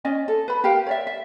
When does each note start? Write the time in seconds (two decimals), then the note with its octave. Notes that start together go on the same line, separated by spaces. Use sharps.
0.05 C#4 D5 D#5 G#5
0.28 A4
0.48 B4 B5
0.64 G4 A#4 F5 G5
0.87 C#5 D5 E5
1.07 E5